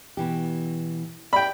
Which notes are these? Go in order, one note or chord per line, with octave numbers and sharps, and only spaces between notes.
B2 E3 G4
G4 D5 G5 B5